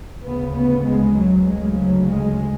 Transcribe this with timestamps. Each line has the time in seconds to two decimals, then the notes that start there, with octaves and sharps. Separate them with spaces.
0.24 D2 C#3 B3
0.55 B3
0.85 G#3
1.16 F#3
1.46 D2 C#3 G#3
1.77 F#3
2.08 G#3